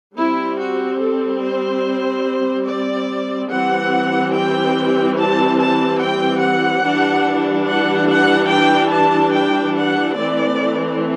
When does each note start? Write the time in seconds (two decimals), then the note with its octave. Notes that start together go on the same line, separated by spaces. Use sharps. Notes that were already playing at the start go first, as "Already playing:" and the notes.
0.18 G3 C4 E4
0.60 F#4
1.01 A4
1.43 C5
2.68 D5
3.51 E3 G3 C4 F#5
4.35 G5
5.18 A5
5.60 A5
6.01 G5
6.43 F#5
6.85 E3 G3 D4
7.69 F#5
8.09 F#5
8.52 G5
8.94 A5
9.34 G5
9.76 F#5
10.18 E3 A3 C4 D5